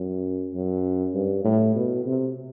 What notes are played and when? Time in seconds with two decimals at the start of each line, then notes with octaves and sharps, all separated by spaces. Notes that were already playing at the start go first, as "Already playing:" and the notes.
Already playing: F#2
0.54 F#2
1.14 G2
1.44 A2
1.76 B2
2.05 C3